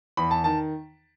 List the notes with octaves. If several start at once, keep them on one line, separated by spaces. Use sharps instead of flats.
E2 B5
A5
D#3 A5